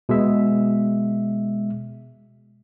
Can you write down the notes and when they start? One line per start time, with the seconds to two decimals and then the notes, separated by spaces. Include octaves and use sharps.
0.09 B2 G#3 E5